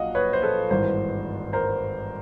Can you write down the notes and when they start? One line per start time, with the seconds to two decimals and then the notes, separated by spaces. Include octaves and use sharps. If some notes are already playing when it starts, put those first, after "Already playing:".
Already playing: A#1 A#2 F#3 D#5 F5 F#5
0.15 B4 C#5
0.33 C5
0.43 A4 B4
0.70 G#1 G2 E3 A#4 C5
1.53 A#4 C5